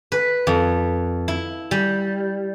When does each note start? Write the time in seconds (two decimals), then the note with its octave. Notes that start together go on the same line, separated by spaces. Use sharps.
0.12 B4
0.47 F2
1.28 E4
1.71 G3